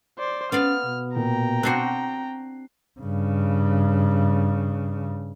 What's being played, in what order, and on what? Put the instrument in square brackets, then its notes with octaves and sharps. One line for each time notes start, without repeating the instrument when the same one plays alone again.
[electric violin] C5 D5
[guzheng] B3 D5 F5 [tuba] C#4 [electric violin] F6
[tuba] B2
[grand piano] A#2 [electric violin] G5 A#5
[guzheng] C4 D4 F#4 [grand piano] F#6 C7
[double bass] G2 C#3